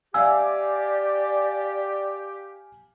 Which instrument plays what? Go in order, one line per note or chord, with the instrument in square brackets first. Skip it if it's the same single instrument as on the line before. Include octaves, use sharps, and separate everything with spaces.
[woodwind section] G4 [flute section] D5 [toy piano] E5 E6 [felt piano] F5 G#5